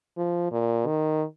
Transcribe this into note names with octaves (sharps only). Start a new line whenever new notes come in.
F3
A#2
D#3